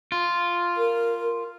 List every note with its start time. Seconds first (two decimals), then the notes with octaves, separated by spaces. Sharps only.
0.12 F4
0.77 A#4